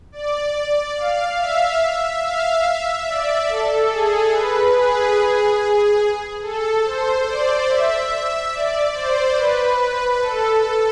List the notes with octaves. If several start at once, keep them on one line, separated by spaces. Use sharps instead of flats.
D5
F5
E5
F5
E5
D5
A4
G#4
B4
G#4
G#4
A4
C5
D5
E5
D5
C5
B4
A4